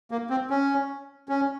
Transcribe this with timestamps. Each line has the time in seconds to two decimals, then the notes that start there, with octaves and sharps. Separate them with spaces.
0.11 A#3
0.30 C4
0.50 C#4
1.29 C#4